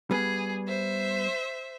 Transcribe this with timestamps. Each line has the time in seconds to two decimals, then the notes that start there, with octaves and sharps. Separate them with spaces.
0.11 G3 B3 G#4
0.67 C5 E5